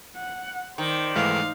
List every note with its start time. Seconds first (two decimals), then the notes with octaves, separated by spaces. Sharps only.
0.16 F#5
0.78 D#3 C5 D5
1.16 G#2 E3 A3 F5